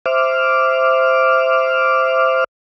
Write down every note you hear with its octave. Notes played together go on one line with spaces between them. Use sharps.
C5 E5 D6 F6